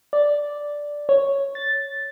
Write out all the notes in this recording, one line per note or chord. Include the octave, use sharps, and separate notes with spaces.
D5
C#5
A6